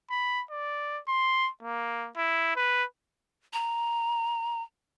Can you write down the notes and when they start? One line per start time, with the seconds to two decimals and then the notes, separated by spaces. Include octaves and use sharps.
0.10 B5
0.50 D5
1.08 C6
1.63 A#3
2.17 E4
2.56 B4
3.53 A#5